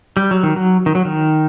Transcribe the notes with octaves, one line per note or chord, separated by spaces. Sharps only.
G3
F#3
D#3
F#3
D#3
F#3
D#3